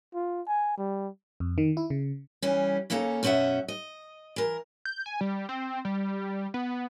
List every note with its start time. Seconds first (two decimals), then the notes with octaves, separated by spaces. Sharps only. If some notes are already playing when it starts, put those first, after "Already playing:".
0.14 F4
0.47 G#5
0.77 G3
1.40 F2
1.58 D#3
1.77 E4
1.90 C#3
2.42 E3 G3 C#4
2.90 C#3 A#3 C#4 A4 A#5
3.23 F#2 B2 C#4 D#4 E5 F#5
3.68 D#5
4.36 E3 A#4
4.85 G6
5.06 G#5
5.21 G3
5.49 C4
5.85 G3
6.54 B3